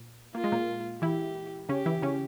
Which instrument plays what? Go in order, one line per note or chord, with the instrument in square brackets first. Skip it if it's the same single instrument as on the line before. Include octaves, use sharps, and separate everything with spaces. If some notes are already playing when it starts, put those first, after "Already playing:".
Already playing: [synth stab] A#2
[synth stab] A#3 [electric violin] F4
[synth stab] G#3
A#2 A#3
[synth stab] E3 E4 [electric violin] G4
[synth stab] C#3 C#4 [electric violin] G4
[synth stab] E3 E4
C#3 C#4